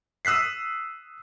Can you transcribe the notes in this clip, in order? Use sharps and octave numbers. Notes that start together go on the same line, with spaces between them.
D#6 E6 F#6 B6 C7